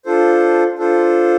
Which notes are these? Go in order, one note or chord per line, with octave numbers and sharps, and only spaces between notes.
D4 F4 A4 C5
D4 F4 A4 C5